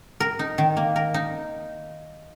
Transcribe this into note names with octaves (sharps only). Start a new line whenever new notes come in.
A#4
D#4
D#3
A#3
A#4
D#4